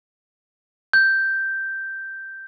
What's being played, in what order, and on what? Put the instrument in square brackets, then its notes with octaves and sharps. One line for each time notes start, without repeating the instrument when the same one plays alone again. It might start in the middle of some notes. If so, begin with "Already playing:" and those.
[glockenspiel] G6